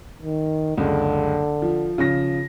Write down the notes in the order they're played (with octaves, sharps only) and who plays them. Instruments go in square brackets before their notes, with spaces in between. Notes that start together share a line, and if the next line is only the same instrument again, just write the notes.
[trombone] D#3
[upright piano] F#1 C#2 [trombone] D3
[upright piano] F3
C#3 F3 A#6